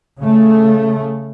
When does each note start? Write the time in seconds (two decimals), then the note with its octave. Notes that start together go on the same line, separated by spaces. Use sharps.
0.19 C#3 A3